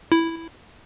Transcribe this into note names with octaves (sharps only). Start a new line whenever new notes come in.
E4